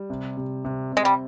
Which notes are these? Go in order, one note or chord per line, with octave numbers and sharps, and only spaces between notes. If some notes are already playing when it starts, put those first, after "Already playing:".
Already playing: G3
C3
C3
C3
C3 G#3
G3